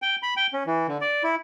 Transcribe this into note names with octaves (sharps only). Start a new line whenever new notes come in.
G5
B5
G5
C#4
E3
D3
D5
E4